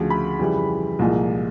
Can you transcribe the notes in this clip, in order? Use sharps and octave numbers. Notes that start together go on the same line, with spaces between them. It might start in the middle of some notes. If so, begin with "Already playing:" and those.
Already playing: D2 C#3 F3
B5
F2 C#3 E3 G3
C2 A#2 F3 G#3